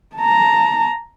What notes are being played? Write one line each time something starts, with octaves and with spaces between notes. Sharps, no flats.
A5 A#5